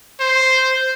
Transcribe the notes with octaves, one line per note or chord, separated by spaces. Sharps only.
C5